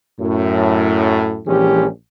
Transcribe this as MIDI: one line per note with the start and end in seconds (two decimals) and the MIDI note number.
0.19 1.40 42
0.19 1.40 45
1.46 1.86 34
1.46 1.86 52
1.46 1.86 56
1.46 1.86 61
1.46 1.86 67